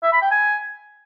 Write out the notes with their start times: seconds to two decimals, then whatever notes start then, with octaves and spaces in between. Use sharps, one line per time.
0.03 E5
0.12 B5
0.22 G5
0.31 G#5